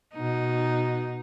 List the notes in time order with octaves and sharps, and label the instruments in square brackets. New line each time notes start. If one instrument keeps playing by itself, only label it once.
[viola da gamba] B2 D#4